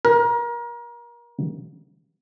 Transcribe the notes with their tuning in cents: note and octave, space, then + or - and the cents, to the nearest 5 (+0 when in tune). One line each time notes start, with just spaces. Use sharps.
A#4 +30